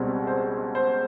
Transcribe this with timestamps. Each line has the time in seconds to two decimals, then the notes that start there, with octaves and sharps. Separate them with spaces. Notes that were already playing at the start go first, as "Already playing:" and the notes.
Already playing: C#2 B2 G3 C4
0.27 C5
0.75 C5